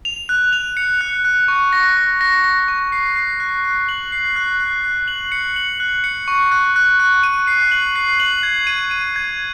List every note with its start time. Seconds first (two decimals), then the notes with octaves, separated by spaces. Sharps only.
0.05 F7
0.29 F#6
0.53 F7
0.77 C#7
1.01 F#6
1.25 F#6
1.48 C#6
1.73 A#6
1.97 A#6
2.21 A#6
2.44 A#6
2.68 C#6
2.92 C7
3.16 C7
3.40 F#6
3.64 F#6
3.89 F#7
4.12 C7
4.36 F#6
4.60 F#6
4.84 F#6
5.08 F#7
5.32 C#7
5.56 F#7
5.80 F#6
6.04 C#7
6.28 C#6
6.52 F#6
6.76 F#6
7.00 F#6
7.23 D#7
7.47 C7
7.71 F#7
7.96 C7
8.20 F#7
8.43 G#6
8.67 D#7
8.91 D#7
9.16 G#6